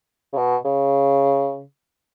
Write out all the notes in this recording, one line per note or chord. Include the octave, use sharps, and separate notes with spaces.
C#3
B2
C#3